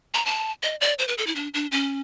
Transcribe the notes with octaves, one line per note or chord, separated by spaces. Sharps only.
A#5
A5
D#5
D5
C5
B4
A4
E4
D4
D4
C#4